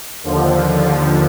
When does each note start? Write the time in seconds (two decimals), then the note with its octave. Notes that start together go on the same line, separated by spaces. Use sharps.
0.23 D#2 D3 F3